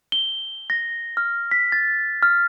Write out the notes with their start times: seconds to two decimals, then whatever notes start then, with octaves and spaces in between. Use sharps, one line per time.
0.12 G7
0.70 A#6
1.17 F6
1.51 B6
1.72 A6
2.23 F6